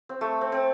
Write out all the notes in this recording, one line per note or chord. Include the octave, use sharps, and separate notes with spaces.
C4
A3
C4
C4